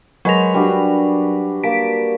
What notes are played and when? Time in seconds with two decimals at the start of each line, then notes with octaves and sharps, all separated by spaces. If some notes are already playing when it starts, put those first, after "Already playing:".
0.25 F#3 G#3 A#4 B4 C#5
0.54 G3 D4 F#4
1.63 A#3 A5 B6 D7